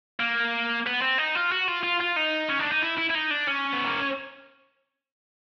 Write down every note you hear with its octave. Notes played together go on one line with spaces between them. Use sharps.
A#3
B3
C4
D#4
F4
F#4
F4
F4
F4
D#4
C#4
D4
D#4
E4
E4
E4
D#4
D4
C#4
B3
A#3